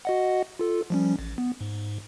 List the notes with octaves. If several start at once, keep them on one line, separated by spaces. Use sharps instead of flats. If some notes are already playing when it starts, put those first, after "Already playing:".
F#4 D#5 F#5
F4 A4
F3 G3 C#4
A1
B3
G#2